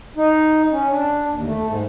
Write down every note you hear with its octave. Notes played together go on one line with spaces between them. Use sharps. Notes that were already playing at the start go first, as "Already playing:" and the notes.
D#4
C#4
D4
D#2
A3
G#2